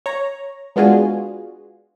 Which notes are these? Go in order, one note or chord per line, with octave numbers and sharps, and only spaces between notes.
C#5 A#5
G#3 B3 D4 F4 F#4 G#4